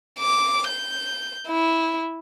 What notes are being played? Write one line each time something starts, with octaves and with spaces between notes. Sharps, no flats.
D6
G6
E4